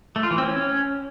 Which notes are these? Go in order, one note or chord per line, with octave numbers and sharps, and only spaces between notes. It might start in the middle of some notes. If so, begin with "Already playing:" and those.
A3
F4
E3
C4
C#4